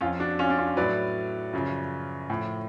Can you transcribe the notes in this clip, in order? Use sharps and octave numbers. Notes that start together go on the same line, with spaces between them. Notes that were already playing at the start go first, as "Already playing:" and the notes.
F2 F3 C#4 F4
D4 F#4
C#4 F4
D4
C#4 F4
A2 F#3 B4 D5
F#2 C#3 F3
A2 F3